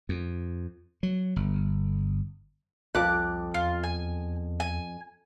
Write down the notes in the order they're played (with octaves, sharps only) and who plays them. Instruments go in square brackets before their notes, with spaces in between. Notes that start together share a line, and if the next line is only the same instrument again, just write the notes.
[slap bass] F2
F#3
G1
[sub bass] C2 [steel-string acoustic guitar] F2 [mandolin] D6 F#6
[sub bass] E2 [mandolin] F4
[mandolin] G#5
G#5